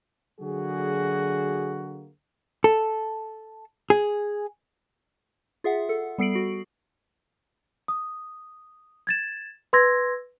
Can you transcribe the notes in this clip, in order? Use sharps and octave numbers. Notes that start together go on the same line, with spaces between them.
D3 F#3 A#3 F#4 G#4
A4
G#4
F4 G#4 E5 F#5
A4
G3 B3 A4 C7 D7 F#7
F#4
D#6
G#6 A6 E7
B4 C6 E6 G#6 A#6